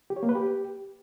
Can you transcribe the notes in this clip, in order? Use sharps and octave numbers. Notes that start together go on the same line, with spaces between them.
G4
C#5
A#3
B4
G4